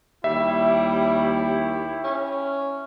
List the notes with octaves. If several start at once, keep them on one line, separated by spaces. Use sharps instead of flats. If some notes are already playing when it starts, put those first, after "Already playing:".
D#2 G3 E4 G4 C#5 E5
C#4